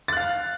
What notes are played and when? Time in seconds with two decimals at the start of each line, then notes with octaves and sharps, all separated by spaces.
0.08 A6
0.13 F#6
0.17 F5